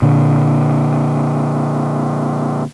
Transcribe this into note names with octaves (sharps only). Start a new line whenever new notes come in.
A#2 D3